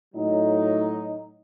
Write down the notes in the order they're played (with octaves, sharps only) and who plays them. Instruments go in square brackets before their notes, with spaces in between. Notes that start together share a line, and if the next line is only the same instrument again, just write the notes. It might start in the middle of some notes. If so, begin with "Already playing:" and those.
[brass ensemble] A2 F#3 D#4